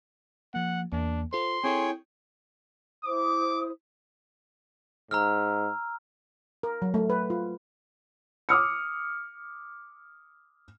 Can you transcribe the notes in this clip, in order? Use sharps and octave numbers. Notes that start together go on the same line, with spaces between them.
F3 A#3 F#5
E2 A#3 D4
F4 A4 C5 C6
C4 E4 G#4 A4 C#5 G5
E4 C5 D6 D#6
G#2 A#5 E6 F6
A#4
F#3
A3
B4
F4
D6 D#6 F6 C#7